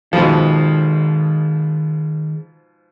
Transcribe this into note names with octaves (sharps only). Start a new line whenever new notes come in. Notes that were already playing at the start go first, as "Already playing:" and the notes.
G#2 B2 D#3 F3 G#3 A4